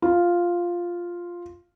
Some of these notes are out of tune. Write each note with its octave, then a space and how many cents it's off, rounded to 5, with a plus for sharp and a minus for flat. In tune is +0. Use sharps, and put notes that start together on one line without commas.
F4 +0